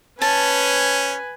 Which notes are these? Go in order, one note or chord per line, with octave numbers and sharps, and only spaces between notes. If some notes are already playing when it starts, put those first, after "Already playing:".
C#4 B4 G#5 A5